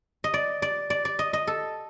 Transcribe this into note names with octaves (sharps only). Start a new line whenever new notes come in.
D#5
D5
D5
D5
D5
D#5
D#5
A4